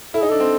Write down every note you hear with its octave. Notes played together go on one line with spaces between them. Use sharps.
E4 A4
D#4 G#4
D4 A4
C4